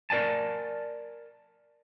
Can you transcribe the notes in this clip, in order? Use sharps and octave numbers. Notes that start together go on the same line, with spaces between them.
A#4 D5 G#5 A5